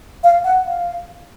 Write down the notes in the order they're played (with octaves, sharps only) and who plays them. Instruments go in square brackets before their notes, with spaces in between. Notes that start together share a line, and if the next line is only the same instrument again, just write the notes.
[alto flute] F5
F#5
F5